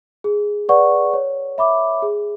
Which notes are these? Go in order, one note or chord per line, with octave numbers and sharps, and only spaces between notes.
G#4
B4 D5 F#5 C#6
C#5
E5 B5 D6
G#4